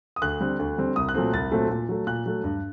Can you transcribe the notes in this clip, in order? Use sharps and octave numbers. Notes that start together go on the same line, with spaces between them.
D#6
D2 F#6
D3 G3 C4
D2
D3 G3 C4
C2 D#6
F#6
A#2 F#3 A3 C4
C2 A6
A#2 F#3 A3 C4
A#2
F#3 A3
A#2 F#6
F#3 A3
G2